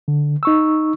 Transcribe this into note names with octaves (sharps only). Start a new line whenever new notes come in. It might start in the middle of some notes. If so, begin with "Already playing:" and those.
D3
D#4 C#6 E6